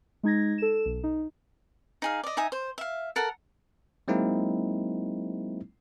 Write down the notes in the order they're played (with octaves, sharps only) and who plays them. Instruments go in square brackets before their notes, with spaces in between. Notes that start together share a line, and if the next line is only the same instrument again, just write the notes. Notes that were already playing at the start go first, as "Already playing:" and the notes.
[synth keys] G#3 D#4 G#6 A#6
A4 E7
B1
D#4
[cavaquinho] D#4 G#4 F5
D5 D#5
D#4 E5 G#5 D#6
C5
E5 F5
A4 A#4 F#5
[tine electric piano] F#3 G#3 A#3 C4 D#4 E4